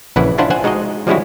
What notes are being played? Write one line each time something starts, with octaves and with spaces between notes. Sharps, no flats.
A#1 C#3 E3 E4 B4 F#5
C#4 D4 E4 F4 C5 F#5
C5 F#5 G#5
G#3 D#4 F#4 G#4 D#5
F3 G3 G#3 C#4 E4 F#4